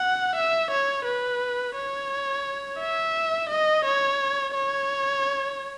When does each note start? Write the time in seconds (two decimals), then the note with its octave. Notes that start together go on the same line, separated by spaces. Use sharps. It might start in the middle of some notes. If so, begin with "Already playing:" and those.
Already playing: F#5
0.35 E5
0.71 C#5
1.05 B4
1.75 C#5
2.80 E5
3.49 D#5
3.85 C#5
4.54 C#5